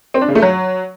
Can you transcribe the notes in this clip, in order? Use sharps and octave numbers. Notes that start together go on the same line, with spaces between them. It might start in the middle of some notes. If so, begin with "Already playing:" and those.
C4
D4
C#3
A3
F#3